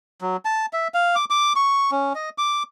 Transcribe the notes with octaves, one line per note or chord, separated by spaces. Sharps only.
F#3
A5
E5
F5
D6
D6
C#6
C#4
D#5
D6